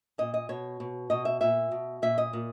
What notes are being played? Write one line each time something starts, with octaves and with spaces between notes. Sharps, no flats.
A#2 D#5
D#5
B2 C#5
B2
B2 D#5
E5
A#2 E5
B2
A#2 E5
D#5
A#2